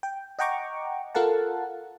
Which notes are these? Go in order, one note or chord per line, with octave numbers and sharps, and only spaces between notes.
G5
D#5 F#5 G5 A#5 C#6 D6
F4 A4 A#4 F5 F#5 A5